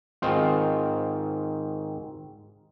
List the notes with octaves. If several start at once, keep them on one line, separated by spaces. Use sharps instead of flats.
G#2 D#3 C4 F4